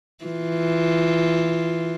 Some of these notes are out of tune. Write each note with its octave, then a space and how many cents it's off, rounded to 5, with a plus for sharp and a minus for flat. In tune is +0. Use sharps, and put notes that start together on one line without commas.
E3 +0 F4 +0